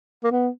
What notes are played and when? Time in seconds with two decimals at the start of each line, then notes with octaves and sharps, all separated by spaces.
0.24 A#3
0.32 B3